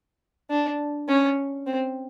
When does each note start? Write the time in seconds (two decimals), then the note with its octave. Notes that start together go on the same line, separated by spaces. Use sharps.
0.50 D4
1.09 C#4
1.67 C4